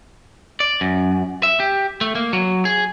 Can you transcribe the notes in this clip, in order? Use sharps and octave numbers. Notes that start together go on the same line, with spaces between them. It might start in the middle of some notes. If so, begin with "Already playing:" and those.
D5
F#2
E5
G4
A3
A#3
F#3
G#4